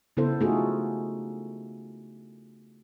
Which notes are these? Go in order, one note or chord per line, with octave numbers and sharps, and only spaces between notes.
C#3 B3 E4 A4 C5
A3 D#4 F4 F#4 G#4 A4